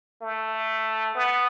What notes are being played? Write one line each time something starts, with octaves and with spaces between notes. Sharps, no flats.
A3
B3